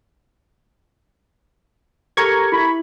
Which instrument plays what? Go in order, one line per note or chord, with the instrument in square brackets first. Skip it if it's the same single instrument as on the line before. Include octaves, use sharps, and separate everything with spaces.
[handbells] G4 A4 A#4 [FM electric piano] A#5 C#6 G#6
[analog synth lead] E4 [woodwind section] B5